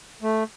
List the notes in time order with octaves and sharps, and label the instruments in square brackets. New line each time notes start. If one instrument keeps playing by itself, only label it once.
[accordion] A3